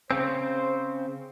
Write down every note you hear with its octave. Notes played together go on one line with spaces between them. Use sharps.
C#3 C4 C5